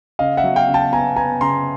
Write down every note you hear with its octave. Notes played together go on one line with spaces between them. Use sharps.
C#3 D#5 F5
E5 F#5
F#3
F5 G5
C#3
G5 A5
B3 G#5 A#5
B3 G#5 A#5
C#3 A#5 C6